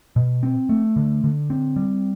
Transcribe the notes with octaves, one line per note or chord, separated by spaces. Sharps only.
B2
C4
A3
D3
D3
C4
G3